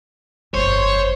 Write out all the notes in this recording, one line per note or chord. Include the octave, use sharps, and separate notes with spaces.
G1 F2 C5 C#5